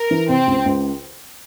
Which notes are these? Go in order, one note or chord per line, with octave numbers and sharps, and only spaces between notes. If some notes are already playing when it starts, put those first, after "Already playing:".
Already playing: A#4
E3
C3 C4
C#2
C#2